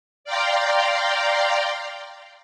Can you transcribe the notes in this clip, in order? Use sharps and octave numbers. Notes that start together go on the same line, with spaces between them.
D5 F5 G5 A#5 C6